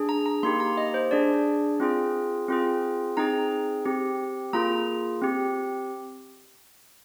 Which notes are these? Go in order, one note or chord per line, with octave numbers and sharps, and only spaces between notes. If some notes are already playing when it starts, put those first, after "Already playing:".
Already playing: D4 G#4
A#5
A#5
A#3 D#4 G4 C6
A#5
D#5
C5
D4 G#4 D5
C4 F4 G#4
C4 F4 G#4
C4 D#4 G#4 A#5
C4 G4
A#3 F4 G#4 A#5
C4 G4